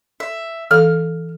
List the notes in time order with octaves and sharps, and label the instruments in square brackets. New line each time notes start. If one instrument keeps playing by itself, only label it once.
[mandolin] E5
[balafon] E3 A4 F5 [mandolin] F6